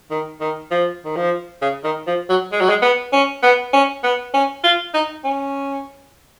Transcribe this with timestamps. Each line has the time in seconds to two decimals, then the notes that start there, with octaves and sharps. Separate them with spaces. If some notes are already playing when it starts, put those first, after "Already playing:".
0.11 D#3
0.41 D#3
0.71 F3
1.05 D#3
1.17 F3
1.62 C#3
1.84 D#3
2.07 F3
2.30 F#3
2.52 G#3
2.61 F#3
2.69 G#3
2.82 B3
3.13 C#4
3.43 B3
3.73 C#4
4.03 B3
4.34 C#4
4.64 F4
4.94 D#4
5.24 C#4